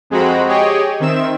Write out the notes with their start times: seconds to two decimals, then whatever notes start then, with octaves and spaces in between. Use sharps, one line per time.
0.10 F2 G#3 C4 F#4 A#5 B5
0.48 G4 G#4 C#5 D#5 G5
1.00 D#3 C4 E5 E7